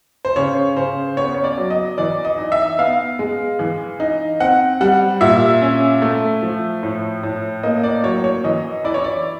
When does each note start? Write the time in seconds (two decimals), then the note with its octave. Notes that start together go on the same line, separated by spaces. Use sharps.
0.25 C5
0.36 C#3 C#5
0.77 C#3 C5
1.17 B3 C#5
1.35 C#5
1.44 D5
1.58 F#3
1.71 D#5
1.98 E3 D5
2.25 D#5
2.38 D#4
2.52 E5
2.79 B3 F5
3.19 G#3
3.59 E3
4.00 D#4
4.40 C4 F#5
4.81 G3 F#5
5.21 A#2 E5
5.62 C#4
6.02 A3
6.42 F3
6.83 A2
7.23 A2
7.63 A#3 D#5
7.83 D5
8.04 F#3 C#5
8.24 C#5
8.44 E3 D#5
8.84 E4 D5
8.94 C#5
9.04 D5